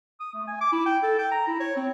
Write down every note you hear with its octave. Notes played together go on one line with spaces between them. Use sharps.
D#6
A3
G#5
D6
E4
G5
A4
G5
A#5
E4
C#5
C4